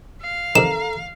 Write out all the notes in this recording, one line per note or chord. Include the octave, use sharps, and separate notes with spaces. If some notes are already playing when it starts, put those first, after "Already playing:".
F5
C3 D#3 A4 A#5 E7